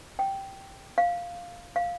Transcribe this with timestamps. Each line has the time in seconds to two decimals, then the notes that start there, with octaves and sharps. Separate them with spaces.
0.19 G5
0.98 F5
1.76 F5